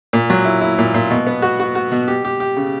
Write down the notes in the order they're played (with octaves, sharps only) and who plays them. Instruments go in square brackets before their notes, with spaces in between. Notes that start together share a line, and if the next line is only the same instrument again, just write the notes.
[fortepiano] A#2
F#3
E4
E4
A#2
A#2
B2
B3
F#4
F#4
F#4
B2
G4
G4
G4
C#3